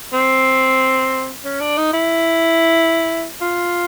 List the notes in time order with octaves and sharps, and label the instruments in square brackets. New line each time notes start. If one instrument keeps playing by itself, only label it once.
[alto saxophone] C4
C#4
D4
D#4
E4
F4